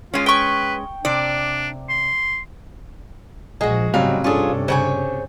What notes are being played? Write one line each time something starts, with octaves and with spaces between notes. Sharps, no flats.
G#3 C#4 F4
B4 G5 C#6
C3 D4 D5
C6
A#1 F3 G#3 F#4 G#4
A1 G#2 C#3 F#3 G3 C4 F5
G2 C3 C#4 D4 F4 G#4 A4
C#3 C5 C#5 G#5